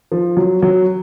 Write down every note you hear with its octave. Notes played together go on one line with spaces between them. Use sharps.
F3
F#3
F#3